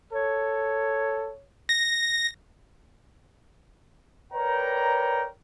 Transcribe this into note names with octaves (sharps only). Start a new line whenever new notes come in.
A4 C#5
A#6
A#4 B4 C#5 D5 G5 A#5